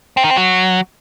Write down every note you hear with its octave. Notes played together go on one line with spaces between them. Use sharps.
C4
D#3
C4
F#3